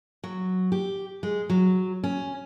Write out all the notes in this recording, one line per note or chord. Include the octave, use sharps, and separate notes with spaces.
F#3
G4
G#3
F#3
C#4